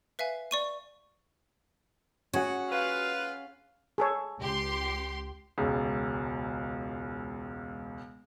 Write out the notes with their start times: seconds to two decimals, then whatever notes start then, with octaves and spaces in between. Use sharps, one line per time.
0.19 B4 E5 F5 G#5
0.51 D5 C#6 D#7
2.33 C#4 F#4 G#4 F#5
2.71 F4 B4 F5
3.98 G#4 A4 C#5
4.39 C#2 G4 C6
5.58 E1 C#2